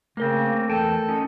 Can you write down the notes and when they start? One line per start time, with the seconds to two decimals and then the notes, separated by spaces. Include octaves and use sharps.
0.17 C#3 A3 A#3 C4 A#4
0.69 E2 A4 G5 A5
1.09 C#4 D#4